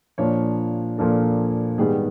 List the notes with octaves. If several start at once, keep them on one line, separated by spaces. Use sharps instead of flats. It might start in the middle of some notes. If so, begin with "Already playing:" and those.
A#2 F3 A#3 D4 C#5
A#2 F3 A#3 D4 A4
G#2 D#3 G3 B3 G#4